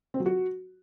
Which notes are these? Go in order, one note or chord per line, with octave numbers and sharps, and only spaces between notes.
C4
F#3
F#4